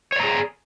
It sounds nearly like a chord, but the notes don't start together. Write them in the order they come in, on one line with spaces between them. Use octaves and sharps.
C#5 D5 A#5 G#4